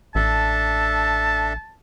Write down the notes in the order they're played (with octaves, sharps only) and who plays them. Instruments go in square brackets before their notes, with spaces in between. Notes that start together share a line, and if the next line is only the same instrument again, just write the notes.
[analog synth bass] A1 [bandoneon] D4 A4 E5 [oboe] A5